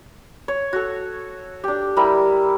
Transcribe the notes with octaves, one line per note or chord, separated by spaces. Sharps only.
C#5
F#4 A4
D4 G4
G3 E4 A#4 B5